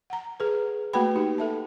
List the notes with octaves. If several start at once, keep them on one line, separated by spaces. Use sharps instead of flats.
F#5 A#5
G#4 B4
A3 A#3 F#4 B4 G5 B5
D#4 G4
A4 E5 A5